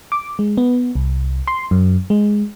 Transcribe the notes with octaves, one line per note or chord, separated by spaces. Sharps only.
D6
G#3
B3
C2
C6
F#2
G#3